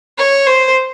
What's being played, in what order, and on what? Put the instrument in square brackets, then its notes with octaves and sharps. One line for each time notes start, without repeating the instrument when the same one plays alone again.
[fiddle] C#5
C5